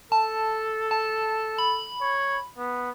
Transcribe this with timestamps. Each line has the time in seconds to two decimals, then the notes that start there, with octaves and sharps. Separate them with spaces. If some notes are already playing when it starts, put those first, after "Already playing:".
0.12 A4 A5
0.91 A5
1.58 B5
2.01 C#5
2.58 B3